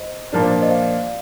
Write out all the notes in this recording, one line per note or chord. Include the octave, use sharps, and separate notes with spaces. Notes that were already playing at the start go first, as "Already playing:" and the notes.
Already playing: C5 D#5
A#2 F3 A#3 D4
C5
D5
C5 D#5
D5 F5